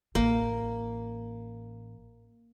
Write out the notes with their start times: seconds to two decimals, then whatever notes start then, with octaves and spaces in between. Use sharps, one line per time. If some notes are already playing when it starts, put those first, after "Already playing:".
0.15 A1 A#3